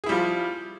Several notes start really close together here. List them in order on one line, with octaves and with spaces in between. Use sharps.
G#4 E4 G3 F3